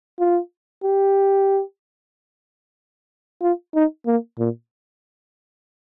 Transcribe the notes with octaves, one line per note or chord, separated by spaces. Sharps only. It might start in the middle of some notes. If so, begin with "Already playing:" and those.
F4
G4
F4
D#4
A#3
A#2